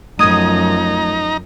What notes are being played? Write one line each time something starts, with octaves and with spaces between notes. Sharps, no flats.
F#2 F3 A3 D#4 A#5 D#6 G#6